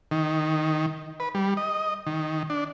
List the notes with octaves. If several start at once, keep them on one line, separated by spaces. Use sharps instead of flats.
D#3
B4
G3
D#5
D#3
D4